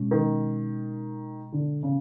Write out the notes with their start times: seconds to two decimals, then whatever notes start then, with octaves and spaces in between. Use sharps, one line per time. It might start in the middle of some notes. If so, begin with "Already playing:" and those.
Already playing: B2 G#3 C#4
0.11 D#3
1.52 D3
1.83 C#3